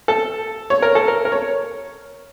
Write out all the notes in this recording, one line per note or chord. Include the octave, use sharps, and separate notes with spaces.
A4
C#5
A#4
A4
A#4
A#4
C#5